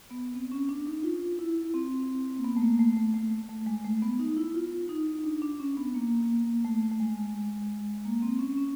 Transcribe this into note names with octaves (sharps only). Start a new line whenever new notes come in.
B3
C4
C#4
D4
D#4
F4
E4
C4
A#3
B3
A3
A#3
A3
A3
A3
A3
G#3
A3
B3
D#4
E4
F4
D#4
D#4
D4
D4
C#4
B3
A#3
A3
A3
G#3
A#3
C4
C#4
C#4